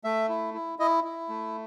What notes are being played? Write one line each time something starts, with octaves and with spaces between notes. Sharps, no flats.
A3 E5
E4
E4
E4 D#5
E4
A3